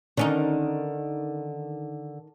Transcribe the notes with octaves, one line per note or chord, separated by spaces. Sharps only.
D3 D#3 C#4 D#4